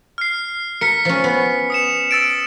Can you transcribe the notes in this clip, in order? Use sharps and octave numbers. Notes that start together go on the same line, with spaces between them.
F6 C7
A#4 B6 C#7
F3 C#4
B3
D#6 C#7 E7
E6 A6 D7